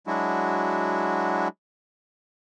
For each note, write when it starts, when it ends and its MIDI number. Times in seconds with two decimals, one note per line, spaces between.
0.07 1.48 54
0.07 1.48 56
0.07 1.48 62
0.07 1.48 64
0.07 1.48 66